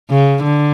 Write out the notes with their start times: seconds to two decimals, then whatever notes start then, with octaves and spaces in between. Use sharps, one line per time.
0.10 C#3
0.44 D3